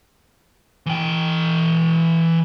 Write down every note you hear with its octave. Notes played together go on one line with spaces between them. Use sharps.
E3 G5